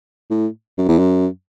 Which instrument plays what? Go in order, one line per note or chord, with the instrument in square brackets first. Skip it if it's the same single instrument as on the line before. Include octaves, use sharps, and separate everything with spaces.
[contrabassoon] A2
F#2
E2
F#2